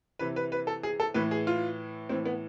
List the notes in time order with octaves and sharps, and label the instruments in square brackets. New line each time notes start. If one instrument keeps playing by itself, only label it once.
[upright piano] C3 E3 B4
B4
B4
A4
G#4
A4
A2 E3 B4
G#4
F4
A2 E3 C4
B3